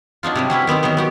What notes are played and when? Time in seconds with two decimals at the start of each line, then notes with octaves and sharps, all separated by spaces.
0.23 F#3 D4 D#4 F4
0.35 C3 F#3 G3
0.50 F#3 C#4 E4 B4
0.67 D#3 B3 C4 D#4
0.83 D#3 E3 F#3 B3
0.97 B3 F#4 G4